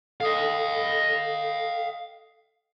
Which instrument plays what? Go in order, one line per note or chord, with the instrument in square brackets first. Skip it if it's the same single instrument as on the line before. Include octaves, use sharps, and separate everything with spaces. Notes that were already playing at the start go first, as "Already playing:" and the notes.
[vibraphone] A4 D#6 [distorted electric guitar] D#5 F5